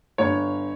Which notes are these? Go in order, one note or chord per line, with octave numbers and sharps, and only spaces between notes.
G1 C#5